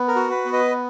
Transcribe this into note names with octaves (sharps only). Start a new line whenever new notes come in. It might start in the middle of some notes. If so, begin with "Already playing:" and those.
Already playing: B3
A#4
F#4
B4
B3
B4 D#5